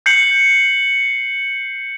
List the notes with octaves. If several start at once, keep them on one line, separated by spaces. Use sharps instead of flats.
G6 C7 C#7 F#7